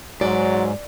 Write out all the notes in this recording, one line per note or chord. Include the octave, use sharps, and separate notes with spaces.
G#2 F#3 D5